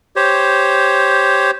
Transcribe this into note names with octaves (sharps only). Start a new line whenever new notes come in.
G4 C5 C#5